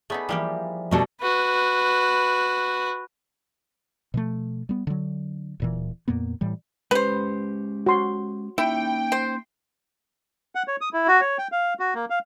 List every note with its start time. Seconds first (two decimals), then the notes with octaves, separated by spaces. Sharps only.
0.10 A3 B3 D#4 G#4 D5 B5
0.29 E3 F3 G3 A#3 G4
0.91 B2 G3 A3 D4 A4 A#4
1.21 F#4 B4
4.14 B2 F3 A3
4.69 G3 B3
4.87 D3 F#3
5.60 D1 A#2 E3
6.08 F2 A#2 A#3 B3
6.41 A2 E3 G3
6.91 G#3 C#4 G4 B4 C5
7.86 F#4 C6
8.58 A#3 C#4 D#4 E4 G5
9.12 C5
10.55 F#5
10.68 C#5
10.81 D#6
10.93 E4
11.08 F#4
11.21 C#5
11.38 G5
11.52 F5
11.80 F#4
11.95 A#3
12.10 F5